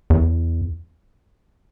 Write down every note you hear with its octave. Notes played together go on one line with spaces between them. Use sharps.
E2